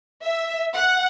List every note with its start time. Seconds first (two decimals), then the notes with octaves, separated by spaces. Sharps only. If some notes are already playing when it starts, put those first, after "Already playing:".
0.22 E5
0.74 F#5